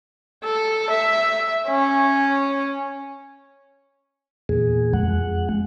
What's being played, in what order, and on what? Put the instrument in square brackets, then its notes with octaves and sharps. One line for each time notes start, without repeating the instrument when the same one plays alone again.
[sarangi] A4
E5
C#4
[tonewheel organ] E2 A#2 G#4
F2 G#3 F#5